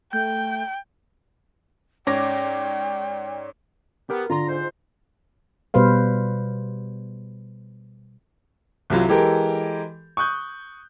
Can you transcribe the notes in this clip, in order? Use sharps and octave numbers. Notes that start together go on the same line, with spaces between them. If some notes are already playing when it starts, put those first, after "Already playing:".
A3 G5 G6
G#2 C#4 D5 G5 D6 A#6
B3 G4 A#4
D3 F4 A#5 C6
G#2 C5
B2 G3 B4 C5 F5
C2 C3 F#3 F4
E3 G#3 G4 A4 A#4
C#6 D#6 F#6 G6